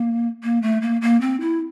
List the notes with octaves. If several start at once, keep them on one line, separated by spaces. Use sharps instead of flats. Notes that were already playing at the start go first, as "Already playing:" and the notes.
Already playing: A#3
A#3
A3
A#3
A#3
C4
E4